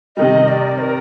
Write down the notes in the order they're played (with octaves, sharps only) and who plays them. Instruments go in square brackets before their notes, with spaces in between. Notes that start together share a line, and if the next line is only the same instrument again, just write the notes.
[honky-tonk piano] C3 D#3 G3 [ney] D#5
[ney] D5
C5
A#4